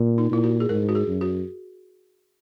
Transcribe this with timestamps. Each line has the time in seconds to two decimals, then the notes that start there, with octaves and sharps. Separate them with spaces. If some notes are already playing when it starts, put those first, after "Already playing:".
Already playing: A#2
0.18 D#4
0.31 A#2 E4
0.44 F#4
0.60 G#4
0.69 G#2 A#4
0.89 F#4
0.95 G#4
1.07 F#2
1.21 F#4